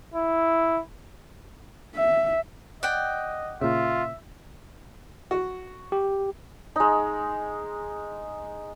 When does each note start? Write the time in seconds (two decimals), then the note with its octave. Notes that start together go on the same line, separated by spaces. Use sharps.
0.14 E4
1.95 E5
2.83 D5 D#5 F#5 G5
3.61 A#2 C#3 F4 E5
5.31 F#4
5.92 G4
6.76 G#3 D#4